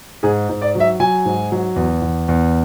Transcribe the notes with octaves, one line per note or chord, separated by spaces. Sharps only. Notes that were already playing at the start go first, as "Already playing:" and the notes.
G#2 G#4
G#2
D5
F#3
E5
F#3 G#5
G#2
F#3
E2
E2
E2